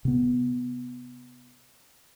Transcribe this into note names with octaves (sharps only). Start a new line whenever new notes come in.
C3 B3